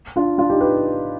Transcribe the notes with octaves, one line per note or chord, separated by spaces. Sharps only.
D4 F4
D4 F4
D#4 G4
G4 B4